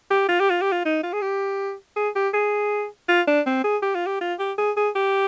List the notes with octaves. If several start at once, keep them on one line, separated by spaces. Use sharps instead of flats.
G4
F4
G4
F4
G4
F4
D#4
F4
G#4
G4
G#4
G4
G#4
F4
D4
C4
G#4
G4
F4
G4
F4
G4
G#4
G#4
G4